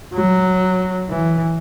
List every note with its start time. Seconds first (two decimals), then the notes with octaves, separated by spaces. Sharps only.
0.14 F#3
1.10 E3